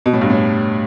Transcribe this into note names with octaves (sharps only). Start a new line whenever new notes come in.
B2
A2
G2
A2